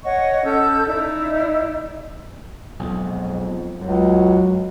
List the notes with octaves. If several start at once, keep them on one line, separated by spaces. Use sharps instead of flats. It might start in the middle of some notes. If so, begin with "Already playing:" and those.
C#5 D#5 F#5 C#6
C#4 A4 E6 G6
D#4 E4 D5
B1 F2 G#2
C#2 F#2 F#3